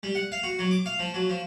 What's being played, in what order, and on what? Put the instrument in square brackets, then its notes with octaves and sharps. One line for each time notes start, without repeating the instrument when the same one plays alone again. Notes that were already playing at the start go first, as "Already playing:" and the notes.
[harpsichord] G3
F#5
F5
F#4
F#3
D6
F5
F3
F#3
F3